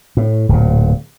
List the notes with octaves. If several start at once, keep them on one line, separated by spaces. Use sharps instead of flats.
A2
D1 A#2